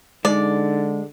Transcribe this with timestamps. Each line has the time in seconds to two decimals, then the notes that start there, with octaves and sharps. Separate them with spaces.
0.25 D3 G#3 D#4 D5 A6